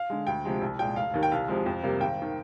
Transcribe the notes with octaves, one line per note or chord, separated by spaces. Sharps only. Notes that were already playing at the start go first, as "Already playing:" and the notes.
Already playing: F5
D3 G#3
D2 G5
C3 F3 G#3
C2
A#2 G#3 G5
F1 F5
D#2 D#3
G5
C2 F5
C3 F3 G#3
F2
C3 G3 A#3
G#1 G5
D#3